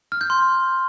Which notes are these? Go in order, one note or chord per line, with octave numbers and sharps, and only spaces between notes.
F6
G6
C6